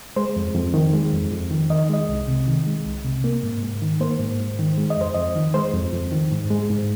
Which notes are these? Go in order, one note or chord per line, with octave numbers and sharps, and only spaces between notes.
G#3 C5
F2
F2
D#3
G#3
F2
F2
D#3
D#3 D#5
G#3 D#5
C2
C3
D#3
G#3
C2
C3
A#3
G#2
G#2
D#3
A#3 C5
G#2
G#2
D#3
G#3
D#5
F2 C5
F2 D#5
D#3
G#3 C5
F2
F2
D#3
G#2
G#3
G#2